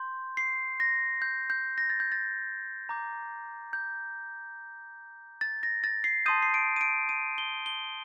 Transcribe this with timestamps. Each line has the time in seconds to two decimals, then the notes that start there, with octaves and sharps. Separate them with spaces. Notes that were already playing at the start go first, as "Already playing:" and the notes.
Already playing: C6 G6
0.37 C7
0.80 A#6
1.22 G6
1.50 G6
1.78 A#6
1.90 A6
2.00 G6
2.12 A6
2.89 A#5 D6 G6
3.73 G6
5.41 A6
5.63 A#6
5.84 A6
6.04 C7
6.26 A5 C6 D#6 G6 D#7
6.42 C7
6.54 D7
6.76 D#7
6.81 D7
7.09 D#7
7.38 G7
7.66 G7